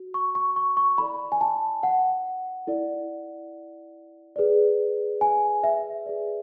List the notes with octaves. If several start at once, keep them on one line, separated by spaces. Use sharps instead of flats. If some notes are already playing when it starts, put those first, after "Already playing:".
Already playing: F#4
C#6
C#6
C#6
C#6
E4 A4 D5 B5
G#5
A5
F#5
E4 A4 D5
G#4 B4 D5
G#5
E5
G#4 B4 D5